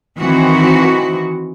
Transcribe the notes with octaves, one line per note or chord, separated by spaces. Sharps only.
D#3 E3 C4 F#4